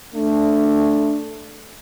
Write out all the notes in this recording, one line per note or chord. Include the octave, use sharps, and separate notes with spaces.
A3 D4